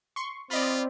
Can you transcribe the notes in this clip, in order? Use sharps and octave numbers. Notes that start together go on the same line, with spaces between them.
C6 C#6
C4 F4 D5 D#5 B5